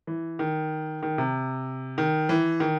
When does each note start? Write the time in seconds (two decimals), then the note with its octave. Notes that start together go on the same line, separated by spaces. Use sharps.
0.07 E3
0.39 D#3
1.03 D#3
1.18 C3
1.98 D#3
2.29 E3
2.60 D#3